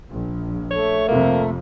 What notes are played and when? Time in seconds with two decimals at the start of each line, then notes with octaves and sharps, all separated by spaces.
0.11 A#1
0.71 A3 C#5
1.08 F2 C3 A#3